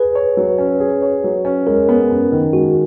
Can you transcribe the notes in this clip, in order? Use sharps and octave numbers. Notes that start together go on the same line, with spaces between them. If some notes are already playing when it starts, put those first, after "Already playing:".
Already playing: G#4 B4
C#5
F#3
C#4
G#4
C#5
F#3
C#4
G#3 A#4
B3
F#2
D#3
G#3 F#4